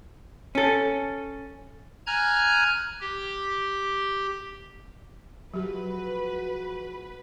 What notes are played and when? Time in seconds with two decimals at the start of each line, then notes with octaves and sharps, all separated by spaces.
0.55 C#4 A4
2.07 G#5 A#5 F6 F#6 G#6
3.01 G4
5.54 F3 F#3 G#3 F#4 G4 B4